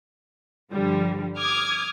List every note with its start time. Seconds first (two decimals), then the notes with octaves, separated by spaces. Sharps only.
0.72 G2 D3 F3 G3
1.36 D6 D#6 F6 G#6